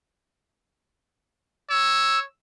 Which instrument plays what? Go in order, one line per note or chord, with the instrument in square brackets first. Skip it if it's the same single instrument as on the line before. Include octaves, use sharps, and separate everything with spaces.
[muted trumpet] C#5 [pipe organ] E6